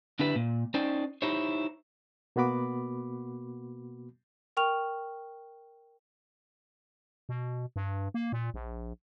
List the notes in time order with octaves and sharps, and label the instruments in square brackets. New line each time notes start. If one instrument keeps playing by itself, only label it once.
[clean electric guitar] D3 D4 E4 G4 B4
A#2
C#4 D#4 C5 D5 G5
D#4 E4 G4 C5 C#5
[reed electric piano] B2 A#3 B3 F#4 B5 D6
[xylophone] A#4 G5 C#6 F6 F7
[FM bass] B2
G2
A#3
A#2
A#1